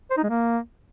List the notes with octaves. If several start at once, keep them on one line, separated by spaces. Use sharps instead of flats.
C5
D#4
G#3
A#3